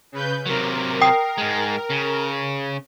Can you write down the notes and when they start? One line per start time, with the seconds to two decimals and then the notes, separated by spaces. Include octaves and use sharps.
0.12 C#3 B4 G6
0.46 C3 F#3 A#4
1.01 G5 D#6 C7
1.38 G#2 G#3
1.90 C#3